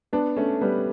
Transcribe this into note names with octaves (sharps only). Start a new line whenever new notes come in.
B3 D4
A3 C#4
G3 B3